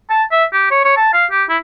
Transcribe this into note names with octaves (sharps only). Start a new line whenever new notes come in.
A5
E5
G4
C#5
C#5
A5
F5
G4
E4